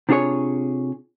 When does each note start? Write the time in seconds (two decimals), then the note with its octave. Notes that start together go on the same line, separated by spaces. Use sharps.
0.09 C3 D4 F4 G#4 C#5